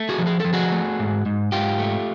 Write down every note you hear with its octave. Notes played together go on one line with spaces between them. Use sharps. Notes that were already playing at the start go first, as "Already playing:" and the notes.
Already playing: A3
F#4 G#4
F3
G#4
F3 A4
F#4 G#4
A3
G#2
G#2
G#2 F4 G4
A3